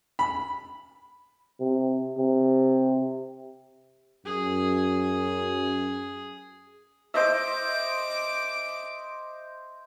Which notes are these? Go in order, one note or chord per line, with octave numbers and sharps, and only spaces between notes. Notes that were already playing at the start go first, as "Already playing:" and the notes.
B5
C3
C3
F#2 G#4
C5 D#5 E5 D6